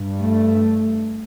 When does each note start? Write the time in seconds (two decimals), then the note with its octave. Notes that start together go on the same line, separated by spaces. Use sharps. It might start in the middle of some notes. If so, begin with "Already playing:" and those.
Already playing: G2
0.20 A3